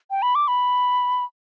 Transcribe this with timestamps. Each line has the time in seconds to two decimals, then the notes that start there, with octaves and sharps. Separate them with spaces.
0.11 G5
0.22 B5
0.35 D6
0.48 B5